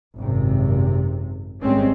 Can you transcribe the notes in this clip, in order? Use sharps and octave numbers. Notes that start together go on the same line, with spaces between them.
G#1 F#2 C3
G#1 G3 G#3 C4 C#4